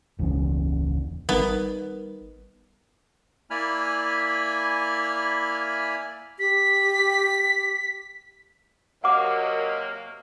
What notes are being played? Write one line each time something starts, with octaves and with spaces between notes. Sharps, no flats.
E1 C#2 E3 C#4
G#1 G3 B3 D#4 A#4
A#3 E4 D5 G#5 B5 F6
G4 B6
C3 F#3 A#3 F#4 C#5 D#5 F#5 D6